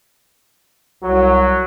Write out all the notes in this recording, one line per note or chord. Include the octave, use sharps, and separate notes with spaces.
C2 F#3